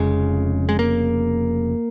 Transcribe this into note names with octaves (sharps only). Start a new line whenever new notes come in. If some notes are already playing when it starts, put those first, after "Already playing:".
Already playing: F1 F2 C#3 G#3
G#3
A#3